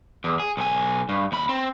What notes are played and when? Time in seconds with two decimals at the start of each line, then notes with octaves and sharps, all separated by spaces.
0.24 E2
0.40 G#4
0.57 B1 G#5
1.09 G2
1.32 D#2 B5
1.49 C4